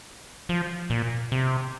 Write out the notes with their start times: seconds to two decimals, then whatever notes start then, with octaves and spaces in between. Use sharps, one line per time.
0.49 F3
0.90 A#2
1.32 C3